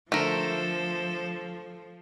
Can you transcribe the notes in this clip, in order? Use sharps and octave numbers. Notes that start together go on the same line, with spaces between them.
D3 F3 A3 A4 A#4 C5